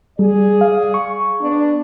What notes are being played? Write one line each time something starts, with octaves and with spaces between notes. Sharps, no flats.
G3 G#4 D5
F5
C#6
B3 D4